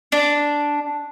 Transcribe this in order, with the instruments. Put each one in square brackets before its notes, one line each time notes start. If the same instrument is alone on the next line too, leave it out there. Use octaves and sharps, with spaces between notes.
[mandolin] D4